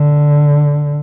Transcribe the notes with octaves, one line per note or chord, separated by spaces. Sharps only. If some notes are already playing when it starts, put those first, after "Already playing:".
Already playing: D3